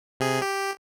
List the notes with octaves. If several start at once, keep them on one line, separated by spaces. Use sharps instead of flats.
C3 G#4
G4